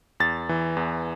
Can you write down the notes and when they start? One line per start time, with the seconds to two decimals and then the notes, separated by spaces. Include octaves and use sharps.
0.20 E2 A6
0.49 E3
0.77 E2